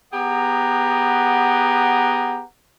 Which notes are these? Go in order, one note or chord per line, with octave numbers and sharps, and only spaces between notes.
B3 G4 G#4 F#5 A#5